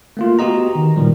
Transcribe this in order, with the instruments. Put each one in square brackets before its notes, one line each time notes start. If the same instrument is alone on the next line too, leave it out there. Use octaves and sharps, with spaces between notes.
[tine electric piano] A3 A#3 F4
B3 F#4 G4 D#5 A#5
D#3
A#2 D#3 F3 G3